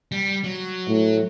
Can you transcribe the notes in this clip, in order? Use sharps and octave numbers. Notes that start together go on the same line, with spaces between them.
G3
F#3
A2